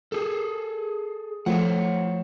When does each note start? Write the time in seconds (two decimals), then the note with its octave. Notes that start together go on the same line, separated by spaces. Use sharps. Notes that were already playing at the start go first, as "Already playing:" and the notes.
0.12 G#4 A4
1.46 F3 A3 C5 C#5 F#5